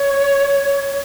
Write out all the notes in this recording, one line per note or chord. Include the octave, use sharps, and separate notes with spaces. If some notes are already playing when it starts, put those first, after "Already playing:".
Already playing: C#5